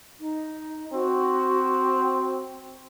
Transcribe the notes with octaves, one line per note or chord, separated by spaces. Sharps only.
D#4
C4 F#4